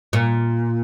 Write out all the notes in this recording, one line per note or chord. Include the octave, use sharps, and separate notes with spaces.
A#2